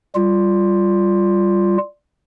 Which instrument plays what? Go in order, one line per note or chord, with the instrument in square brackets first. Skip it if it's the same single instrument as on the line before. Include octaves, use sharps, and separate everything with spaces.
[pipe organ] G3 F4